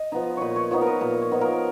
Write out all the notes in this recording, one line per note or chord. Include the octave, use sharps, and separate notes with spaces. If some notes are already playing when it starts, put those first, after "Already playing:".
Already playing: D#5
F3 B3 D#4
A#2 B4 C#5
C#5
F3 B3 D#4 C#5
A#4
B4
A#2 A#4
C#5
F3 B3 D#4
A#4